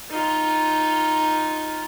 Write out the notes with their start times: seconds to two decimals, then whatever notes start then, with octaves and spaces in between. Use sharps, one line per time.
0.10 D#4 F4